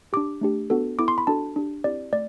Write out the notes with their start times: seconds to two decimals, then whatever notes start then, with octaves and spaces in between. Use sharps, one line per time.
0.13 D4 G4 D6
0.41 A3 D4 G4
0.70 B3 D4 F#4 A4
0.99 B3 E4 A4 D6
1.08 C6
1.18 B5
1.27 D4 F#4 A4 A5
1.56 D4 G4
1.84 C4 E4 G4 D5
2.12 A3 D5